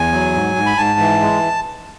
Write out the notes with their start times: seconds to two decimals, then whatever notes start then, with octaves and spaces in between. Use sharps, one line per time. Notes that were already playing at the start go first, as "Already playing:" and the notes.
Already playing: E2 G#5
0.12 F#3
0.34 G#2
0.56 G#2
0.66 B5
0.77 G#2 A5
0.99 E3
1.21 G#3